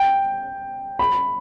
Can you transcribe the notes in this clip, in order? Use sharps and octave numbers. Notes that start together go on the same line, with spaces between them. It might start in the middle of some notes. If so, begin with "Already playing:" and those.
Already playing: G5
B5